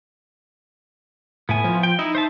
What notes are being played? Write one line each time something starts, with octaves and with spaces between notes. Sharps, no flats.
A2 B3 E4 G#5
F3
G5
D#4 E4
C5 E5 A5